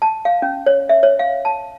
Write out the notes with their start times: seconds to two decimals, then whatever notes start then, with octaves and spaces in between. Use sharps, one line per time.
0.02 A5
0.25 F5
0.42 C#4
0.66 C#5
0.89 E5
1.03 C#5
1.19 F5
1.45 A5